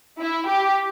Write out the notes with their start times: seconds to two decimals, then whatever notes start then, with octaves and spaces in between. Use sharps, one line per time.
0.20 E4
0.48 G4